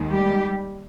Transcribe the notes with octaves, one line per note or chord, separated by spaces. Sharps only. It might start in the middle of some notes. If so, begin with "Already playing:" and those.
Already playing: D#2 D#3 G#3
G3 G4